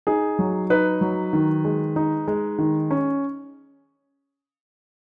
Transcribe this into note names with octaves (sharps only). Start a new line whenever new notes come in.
D#4 G#4
F#3
D#4 B4
F#3
D#3
G#3
D#4
G#3
D#3
C#4